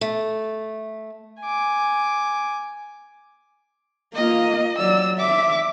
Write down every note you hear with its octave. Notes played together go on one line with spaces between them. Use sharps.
A3
G#5 D6
A#3 F4 D#5
F#3 D5 E6
E5 D6